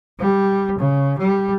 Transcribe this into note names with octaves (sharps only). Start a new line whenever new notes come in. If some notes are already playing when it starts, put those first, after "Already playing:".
G3
C#3
G3